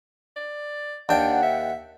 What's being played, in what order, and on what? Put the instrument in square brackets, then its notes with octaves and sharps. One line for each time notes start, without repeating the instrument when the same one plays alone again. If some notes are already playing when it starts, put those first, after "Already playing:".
[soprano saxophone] D5
[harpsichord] D#2 G5 [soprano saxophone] D4 [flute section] F#5
[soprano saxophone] E5